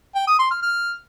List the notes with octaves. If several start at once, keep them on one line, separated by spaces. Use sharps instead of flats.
G5
D#6
C6
F6
F6